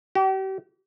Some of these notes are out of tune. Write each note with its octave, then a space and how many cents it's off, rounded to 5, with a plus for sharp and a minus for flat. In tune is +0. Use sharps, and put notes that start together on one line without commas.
G4 -40